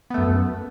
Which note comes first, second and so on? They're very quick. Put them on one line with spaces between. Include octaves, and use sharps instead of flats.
B3 A3 F#2